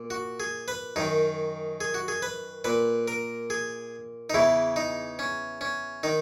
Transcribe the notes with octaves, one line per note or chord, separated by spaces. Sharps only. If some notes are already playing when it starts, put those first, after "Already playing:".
Already playing: A#2
F#4
G#4
B4
F#2 D#3 D#4
G#4
F#4
G#4
B4
A#2 B4
A#4
G#4
D#4
E2 C#3 E3 E4
D#4
C#4
C#4
D#3 D#4